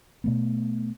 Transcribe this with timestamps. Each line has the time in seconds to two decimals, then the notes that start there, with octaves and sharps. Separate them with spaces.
0.24 B2 A3 B3